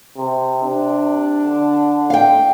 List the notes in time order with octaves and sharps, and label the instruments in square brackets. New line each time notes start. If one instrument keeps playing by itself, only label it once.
[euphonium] C3
[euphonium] C3 [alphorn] D4
[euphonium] D3
[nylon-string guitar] F5 G5